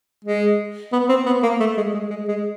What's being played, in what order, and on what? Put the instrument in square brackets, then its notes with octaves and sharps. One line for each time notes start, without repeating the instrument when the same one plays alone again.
[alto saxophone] G#3
B3
C4
B3
A#3
A3
G#3
G#3
G#3
G#3